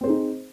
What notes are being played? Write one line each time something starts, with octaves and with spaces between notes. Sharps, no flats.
C4 D#4 G#4 C5